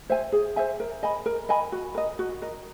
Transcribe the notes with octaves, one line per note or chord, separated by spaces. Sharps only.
C5 E5 G#5
G#4
C5 E5 G#5
A#4
D#5 G#5 B5
A#4
D#5 G#5 B5
F#4
A#4 D#5
F#4
A#4 D#5